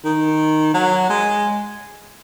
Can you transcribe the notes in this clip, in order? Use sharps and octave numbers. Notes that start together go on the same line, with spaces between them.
D#3
F#3
G#3